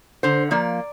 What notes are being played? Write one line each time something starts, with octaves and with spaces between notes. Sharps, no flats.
D3 C5
F3 A#3 D5